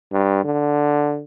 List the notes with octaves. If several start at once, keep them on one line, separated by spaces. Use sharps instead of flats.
G2
D3